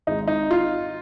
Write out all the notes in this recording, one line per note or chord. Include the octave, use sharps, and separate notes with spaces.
G#1 G#2 G#3 D#4
D#4
F4